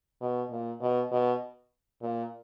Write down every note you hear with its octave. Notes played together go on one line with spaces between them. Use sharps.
B2
A#2
B2
B2
A#2